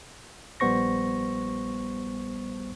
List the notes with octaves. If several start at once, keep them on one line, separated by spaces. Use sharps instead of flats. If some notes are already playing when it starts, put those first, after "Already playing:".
A#1 G3 B3 C5 C#6 A#6